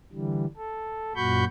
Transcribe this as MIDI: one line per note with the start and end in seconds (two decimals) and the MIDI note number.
0.13 0.46 50
0.13 0.46 52
0.13 0.46 55
0.57 1.13 69
1.16 1.45 42
1.16 1.45 46
1.16 1.45 66
1.16 1.45 83
1.16 1.45 85
1.16 1.45 91